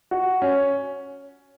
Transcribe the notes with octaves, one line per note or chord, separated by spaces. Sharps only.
F#4
C#4